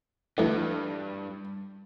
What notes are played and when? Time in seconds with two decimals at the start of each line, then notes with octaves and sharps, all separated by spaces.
0.38 D2 G2 E3